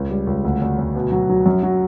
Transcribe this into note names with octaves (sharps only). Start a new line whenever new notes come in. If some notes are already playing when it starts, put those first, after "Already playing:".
Already playing: C#2
G3
C#2
D2
D2
D2
B2
F#3
F#3
F#2
F#3